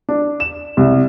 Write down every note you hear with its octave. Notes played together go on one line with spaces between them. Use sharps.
D4
E7
C2